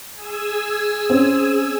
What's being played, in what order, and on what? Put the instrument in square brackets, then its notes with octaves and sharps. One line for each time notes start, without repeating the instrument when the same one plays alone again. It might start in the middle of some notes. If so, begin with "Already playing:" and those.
[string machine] G#4 G#5 E6
[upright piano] C4 C#4